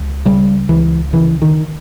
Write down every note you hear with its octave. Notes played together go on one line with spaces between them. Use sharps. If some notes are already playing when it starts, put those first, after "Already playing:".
Already playing: C#2
C#3 G3
C#2 E3
C#3 E3
D#3